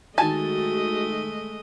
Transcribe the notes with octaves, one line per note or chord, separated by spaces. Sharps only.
D#3 G#3 A3 F#4 D#5 G#5 A5 A6